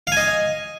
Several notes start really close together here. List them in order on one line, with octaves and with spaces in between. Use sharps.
F5 G#5 D#5